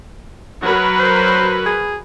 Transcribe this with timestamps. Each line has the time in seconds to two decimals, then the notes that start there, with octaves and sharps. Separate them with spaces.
0.63 F#3 F#4 A#4 B4
1.00 C5
1.66 G#4